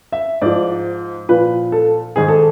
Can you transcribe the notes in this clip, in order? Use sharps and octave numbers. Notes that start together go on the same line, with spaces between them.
E5
G#2 F3 D5
A#2 F3 B4
A4
G#2 D#3 G#4
A4